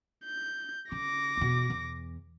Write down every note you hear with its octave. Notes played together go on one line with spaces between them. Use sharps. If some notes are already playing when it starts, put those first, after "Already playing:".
G6
C#3 D6 A#6
E2 B2
E2